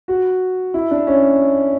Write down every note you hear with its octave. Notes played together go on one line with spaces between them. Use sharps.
F#4
E4
D4
C#4